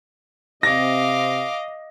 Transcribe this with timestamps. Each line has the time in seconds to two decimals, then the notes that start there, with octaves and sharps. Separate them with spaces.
0.63 C3 C4 D#5 F5 D6 A#6